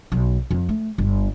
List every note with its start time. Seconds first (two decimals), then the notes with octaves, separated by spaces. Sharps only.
0.12 B1
0.51 F2
0.69 A3
0.98 G1